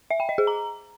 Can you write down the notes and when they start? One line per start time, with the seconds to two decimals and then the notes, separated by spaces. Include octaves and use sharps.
0.11 E5
0.20 G5
0.29 D#5
0.38 G#4
0.47 A#5